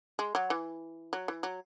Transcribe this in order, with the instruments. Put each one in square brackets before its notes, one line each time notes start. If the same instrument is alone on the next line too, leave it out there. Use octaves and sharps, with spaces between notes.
[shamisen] G#3
F#3
E3
F#3
E3
F#3